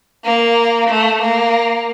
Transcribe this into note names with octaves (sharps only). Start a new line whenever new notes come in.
A#3
A3
A#3